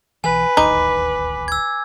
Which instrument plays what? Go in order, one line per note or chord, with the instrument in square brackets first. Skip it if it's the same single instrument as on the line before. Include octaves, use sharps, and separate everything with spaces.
[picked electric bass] B1 E3 [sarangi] B4 [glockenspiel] G#5
[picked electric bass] D1 A1 D#2 [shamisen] D#4 [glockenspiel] D6
[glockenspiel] E6 G#6